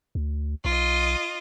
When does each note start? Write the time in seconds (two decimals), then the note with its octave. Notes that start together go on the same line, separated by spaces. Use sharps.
0.15 D2
0.65 B1 F4 D#5